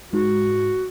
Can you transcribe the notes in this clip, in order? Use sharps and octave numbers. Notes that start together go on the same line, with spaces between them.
G#2 F#4